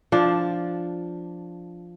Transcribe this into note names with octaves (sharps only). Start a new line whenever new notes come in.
F3 D4